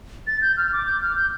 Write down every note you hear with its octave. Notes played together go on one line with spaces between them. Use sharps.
A6
G6
F6
D6
G6
F6
G6